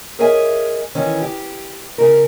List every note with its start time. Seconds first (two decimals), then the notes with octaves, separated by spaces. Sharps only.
0.19 G#4 A#4 C#5 D#5 E5 G#5
0.95 D#3 E3 C#4
1.22 G4
1.98 C#3 A#4